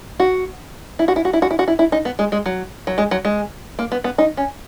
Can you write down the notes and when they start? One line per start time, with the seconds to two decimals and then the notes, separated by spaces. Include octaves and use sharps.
0.20 F#4
0.99 E4
1.08 F#4
1.16 E4
1.25 F#4
1.33 E4
1.42 F#4
1.51 E4
1.59 F#4
1.68 E4
1.79 E4
1.92 D#4
2.05 B3
2.19 G#3
2.32 G#3
2.46 F#3
2.87 F#3
2.98 G#3
3.11 F#3
3.25 G#3
3.79 A#3
3.92 B3
4.04 B3
4.18 D#4
4.37 C#4